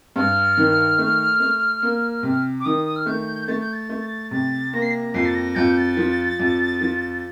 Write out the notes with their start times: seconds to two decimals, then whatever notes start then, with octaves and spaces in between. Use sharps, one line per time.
0.16 G2 F6
0.57 D#3
0.98 A3
1.40 A3
1.83 A#3
2.23 C3
2.60 D6
2.65 D#3 D#6
2.85 D#6
2.96 F6
3.06 A3 G6
3.48 A3 A6
3.60 G6
3.73 A6
3.90 A3
4.31 C3 A6
4.73 A#3 A#6
4.82 C7
4.91 A#6
5.14 F2 C7
5.25 A6
5.35 A#6
5.55 F2 G6
5.77 A6
5.97 F3
6.39 F2
6.81 F3